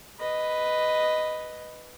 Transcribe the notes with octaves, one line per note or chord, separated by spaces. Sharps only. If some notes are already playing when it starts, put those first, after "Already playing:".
B4 D#5